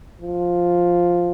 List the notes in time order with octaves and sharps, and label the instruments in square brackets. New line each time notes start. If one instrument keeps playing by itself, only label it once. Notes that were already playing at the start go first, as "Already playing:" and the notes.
[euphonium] F3